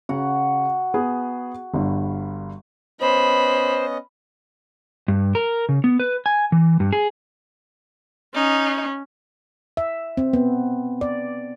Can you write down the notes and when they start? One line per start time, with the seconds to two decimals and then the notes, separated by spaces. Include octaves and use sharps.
0.09 C#3 F#4 F#5 A#5
0.94 B3 G#4
1.74 G1 G2
3.01 B3 C#4 C5 D#5 B5
5.08 G2
5.35 A#4
5.69 C#3
5.84 B3
6.00 B4
6.26 G#5
6.52 E3
6.80 G2
6.92 G#4
8.35 C#4 D#4
9.77 E5
10.17 C4
10.33 B3
11.01 D5